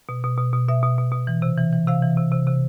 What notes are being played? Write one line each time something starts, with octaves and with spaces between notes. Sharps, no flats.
B2
B2
B2
B2
B2 E5
B2
B2
B2
E3
C3
E3
E3
C3 F5
E3
C3
C3
C3